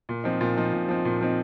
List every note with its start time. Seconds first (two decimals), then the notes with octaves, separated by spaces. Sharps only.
0.09 A#2
0.24 F3 C4 D#4
0.41 A#2
0.57 F3 C4 D#4
0.73 A#2
0.88 F3 C4 D#4
1.05 A#2
1.21 F3 C4 D#4